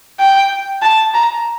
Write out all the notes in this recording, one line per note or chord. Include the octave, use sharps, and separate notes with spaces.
G5
A5
A#5